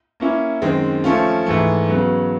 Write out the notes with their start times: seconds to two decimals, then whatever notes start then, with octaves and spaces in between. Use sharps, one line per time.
0.20 A#3 C#4 E4
0.62 F#2 D#3 G#3 C4
1.04 F3 A3 C#4 F4
1.46 G#2 E3 A3
1.88 C#3 F#3 B3